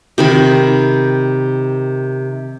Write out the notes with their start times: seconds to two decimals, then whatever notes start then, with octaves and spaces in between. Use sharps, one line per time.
0.18 C3 D#3 B5